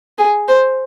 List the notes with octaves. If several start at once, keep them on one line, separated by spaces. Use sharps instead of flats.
G#4
C5